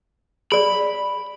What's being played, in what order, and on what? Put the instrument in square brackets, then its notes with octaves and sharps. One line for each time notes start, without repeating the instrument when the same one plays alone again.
[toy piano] G#4 D5 [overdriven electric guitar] B5